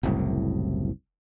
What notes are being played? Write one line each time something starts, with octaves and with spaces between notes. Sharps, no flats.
F#1 C2 A2